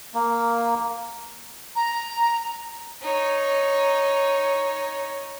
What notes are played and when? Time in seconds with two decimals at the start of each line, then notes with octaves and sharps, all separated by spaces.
0.14 A#3
1.76 A#5
3.03 D#4 C#5